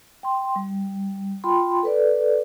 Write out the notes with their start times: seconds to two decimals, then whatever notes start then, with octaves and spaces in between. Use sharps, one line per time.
0.23 G5 C6
0.56 G3
1.44 F4 G5 B5 C6
1.83 A4 B4 D5